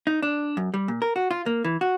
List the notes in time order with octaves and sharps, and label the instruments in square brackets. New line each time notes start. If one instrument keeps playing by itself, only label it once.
[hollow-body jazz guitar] D#4
D4
F#2
G3
A#2
A#4
F#4
F4
A#3
E3
F#4